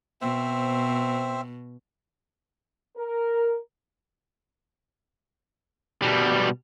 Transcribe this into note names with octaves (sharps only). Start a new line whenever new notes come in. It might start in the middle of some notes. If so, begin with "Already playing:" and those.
B2 C4 C5 E5
A#4
B2 G3